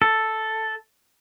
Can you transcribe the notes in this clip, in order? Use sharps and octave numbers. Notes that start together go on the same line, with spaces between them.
A4